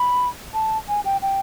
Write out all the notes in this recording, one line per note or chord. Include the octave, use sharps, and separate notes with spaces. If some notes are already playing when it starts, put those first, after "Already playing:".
Already playing: B5
A5
G#5
G5
G5